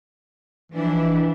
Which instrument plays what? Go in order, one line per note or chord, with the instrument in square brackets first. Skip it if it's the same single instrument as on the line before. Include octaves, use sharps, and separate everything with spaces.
[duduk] E3 [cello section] F3 D4 E4